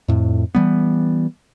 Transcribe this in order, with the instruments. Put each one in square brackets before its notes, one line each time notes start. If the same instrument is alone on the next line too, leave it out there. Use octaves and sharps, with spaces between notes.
[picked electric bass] F2 A2
E3 G3 B3